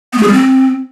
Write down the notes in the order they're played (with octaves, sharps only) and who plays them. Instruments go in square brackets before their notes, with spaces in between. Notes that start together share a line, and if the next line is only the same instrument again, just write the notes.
[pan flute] B3
A3
G#4
G3
C4